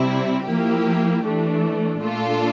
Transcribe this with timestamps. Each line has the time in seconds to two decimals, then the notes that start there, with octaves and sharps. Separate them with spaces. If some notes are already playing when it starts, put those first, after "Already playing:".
Already playing: C3 G3 C4 E4
0.45 F3 A#3 E4 G4
1.24 E3 A3 D4
2.01 A#2 A3 D4 F4 A4